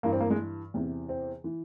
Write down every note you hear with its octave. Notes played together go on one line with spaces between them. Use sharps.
G2 E3 A#3
C4
A#3
G#3
E2 C3 E3
C4
E3